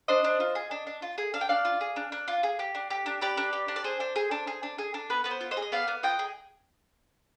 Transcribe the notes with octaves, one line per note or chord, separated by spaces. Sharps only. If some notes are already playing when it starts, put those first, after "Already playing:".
D4 C5 D#5
D4
F4
G#4
D4
D4
F4
G#4
D4 F5
G5
D4 D5 F5
F4
G#4
D4
D4
F4
G#4
G4
D4
G4
D4
G4 B4 D5
D4
G4
D4
D5
G#4 C5
D4
G#4
D4
G#4
D4
G#4
D4
B3 B4
B3 B4
C5
F4
C5 D#5
G#4
D#5
B3 D5 F5
B3
F4 D#5 G5
G#4